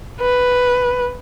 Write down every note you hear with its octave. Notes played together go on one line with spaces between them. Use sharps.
B4